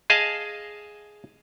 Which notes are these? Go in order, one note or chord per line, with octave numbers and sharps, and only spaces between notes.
G#4 D#5 F5 G#5 A5